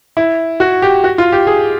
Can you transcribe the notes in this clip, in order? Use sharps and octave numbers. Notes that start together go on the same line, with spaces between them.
E4
F#4
G4
F#4
F4
G4
G#4